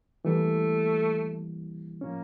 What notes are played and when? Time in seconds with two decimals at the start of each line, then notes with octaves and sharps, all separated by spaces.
0.25 E3 G3 A3 A#3 E4
2.01 A2 F3 A#3 C#4